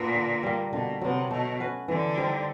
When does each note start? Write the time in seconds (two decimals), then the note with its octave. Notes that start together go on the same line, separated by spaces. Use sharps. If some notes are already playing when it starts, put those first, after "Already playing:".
Already playing: A#2 B3 D4
0.14 D3
0.43 G3 A#3
0.72 B2 D3
1.01 C3 F#3 B3
1.30 B2 A3
1.60 C#4 F#4 B4
1.88 D3 E3
2.17 G3 C4 D#4